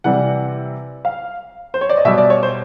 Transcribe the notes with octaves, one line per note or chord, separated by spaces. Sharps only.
C3 E3 G3 F#5
F5
C5
C#5
D5
D#5
B2 G3 E5
D5
C#5
C5